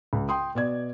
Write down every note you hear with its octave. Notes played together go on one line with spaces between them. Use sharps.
C#2
G5 C6 D#6
B2 D5 G#6